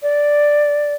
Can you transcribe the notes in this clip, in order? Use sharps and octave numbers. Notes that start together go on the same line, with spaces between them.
D5